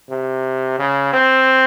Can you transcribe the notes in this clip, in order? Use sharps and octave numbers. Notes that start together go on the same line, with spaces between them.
C3
C#3
C4